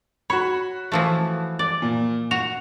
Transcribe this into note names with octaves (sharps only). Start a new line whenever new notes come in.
F#4 C#5 B5
E3 F3 A3
D5
A#2
F#4 F7